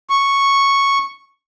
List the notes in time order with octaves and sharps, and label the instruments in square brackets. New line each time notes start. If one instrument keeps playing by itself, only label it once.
[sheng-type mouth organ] C#6